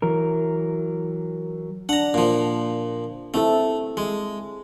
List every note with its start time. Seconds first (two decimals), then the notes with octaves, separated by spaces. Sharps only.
0.02 E3 F#3 A#4
1.89 D4 F#5 A#5
2.14 A#2 F3
3.34 A3 C4 E4 A4
3.97 G#3